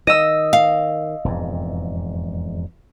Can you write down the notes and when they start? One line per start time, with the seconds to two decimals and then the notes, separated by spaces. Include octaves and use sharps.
0.07 D#3 D#5 E6
0.53 F5
1.25 E1 F2 G#2